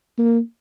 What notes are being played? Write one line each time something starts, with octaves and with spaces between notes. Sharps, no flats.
A#3